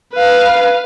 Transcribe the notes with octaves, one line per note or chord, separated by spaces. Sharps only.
B4 F5